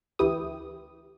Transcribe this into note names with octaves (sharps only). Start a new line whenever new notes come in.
D2 E3 E4 G4 D#6